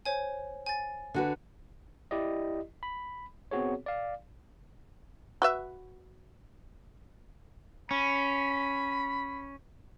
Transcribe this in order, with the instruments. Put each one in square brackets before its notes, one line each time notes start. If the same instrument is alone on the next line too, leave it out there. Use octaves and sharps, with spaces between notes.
[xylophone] C5 C#5 G#5
G#5 A6
[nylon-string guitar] D3 F#4 B4
[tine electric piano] E4 G4 D5 D#5
B5
B3 C4 F#4 G#4 C#5
D5 F5
[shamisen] F#4 B4 E5
[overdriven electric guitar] C#4 [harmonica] B5